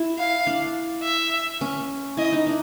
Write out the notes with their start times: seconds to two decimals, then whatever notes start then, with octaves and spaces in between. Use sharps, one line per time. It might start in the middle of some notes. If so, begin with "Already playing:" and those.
Already playing: E4
0.19 F5
0.47 D4
1.03 E5
1.61 C#4
2.17 E4 D#5
2.32 D#4
2.47 D4